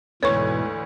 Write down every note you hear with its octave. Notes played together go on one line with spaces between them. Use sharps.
D2 G#2 B2 E3 B4 C#5 C#6 G#6